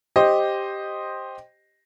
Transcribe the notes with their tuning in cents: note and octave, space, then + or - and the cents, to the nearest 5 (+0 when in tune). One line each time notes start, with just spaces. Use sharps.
G4 +0 C5 +5 D#5 -5